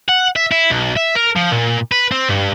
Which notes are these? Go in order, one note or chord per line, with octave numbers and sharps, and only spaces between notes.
F#5
E5
E4
B1
E5
A#4
F3
A#2
B4
C4
G2